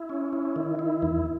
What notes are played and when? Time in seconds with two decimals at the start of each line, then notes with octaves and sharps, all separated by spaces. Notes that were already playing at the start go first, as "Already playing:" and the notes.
Already playing: E4
0.09 C#4
0.33 E4
0.56 D#3
0.79 E4
1.02 E2